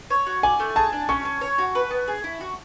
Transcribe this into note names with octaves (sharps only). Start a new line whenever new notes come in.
C#5
F#4
D5 G#5
A3
G#4 A5
D4
C#4 C#6
C#4
C#5
F#4
B4
B3
G#4
E4
F#4